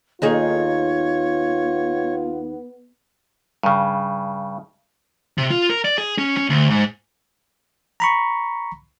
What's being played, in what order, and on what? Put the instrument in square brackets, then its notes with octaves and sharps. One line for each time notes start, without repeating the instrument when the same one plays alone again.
[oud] D#2 D#4 G#4 [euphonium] B3 [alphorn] F4 [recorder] C#5
[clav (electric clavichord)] G2 C#3
[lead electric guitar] C3
F4
A#4
D5
G#4
C#4
C#4
D2
G#2
[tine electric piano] A#5 B5 C#6